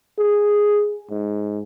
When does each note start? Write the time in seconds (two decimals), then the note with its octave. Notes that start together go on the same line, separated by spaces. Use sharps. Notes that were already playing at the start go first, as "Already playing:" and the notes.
0.19 G#4
1.11 G#2